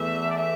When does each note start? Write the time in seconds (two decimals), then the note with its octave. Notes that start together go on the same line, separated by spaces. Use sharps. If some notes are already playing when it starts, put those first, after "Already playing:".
Already playing: E2 E3 A3 E5
0.30 D5
0.36 E5